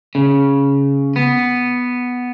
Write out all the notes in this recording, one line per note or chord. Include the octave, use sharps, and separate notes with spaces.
C#3
B3